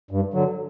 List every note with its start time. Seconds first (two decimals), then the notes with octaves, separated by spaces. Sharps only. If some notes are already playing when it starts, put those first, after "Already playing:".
0.11 G2
0.34 D3 F#3